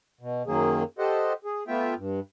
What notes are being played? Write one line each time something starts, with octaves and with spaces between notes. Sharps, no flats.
B2
F#2 D#3 F#3 A#3 G#4
G4 A4 C5 D#5 F#5
G#4
A3 B3 F4 E5 G5
G2